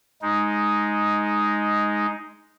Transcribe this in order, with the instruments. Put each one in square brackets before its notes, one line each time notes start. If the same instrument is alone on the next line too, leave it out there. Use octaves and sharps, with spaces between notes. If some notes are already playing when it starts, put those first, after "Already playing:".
[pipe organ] G#3 D#4